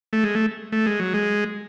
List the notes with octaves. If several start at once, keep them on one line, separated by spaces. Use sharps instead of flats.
A3
G#3
A3
A3
G#3
F#3
G#3